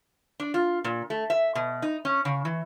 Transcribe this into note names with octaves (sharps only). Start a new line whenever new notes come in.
D4
F4
A#2
A3
E5
B2
D#4
C#4
C#3
E3